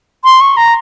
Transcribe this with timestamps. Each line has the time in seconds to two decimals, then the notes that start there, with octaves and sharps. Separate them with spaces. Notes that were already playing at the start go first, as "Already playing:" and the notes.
0.25 C6
0.41 C#6
0.57 A#5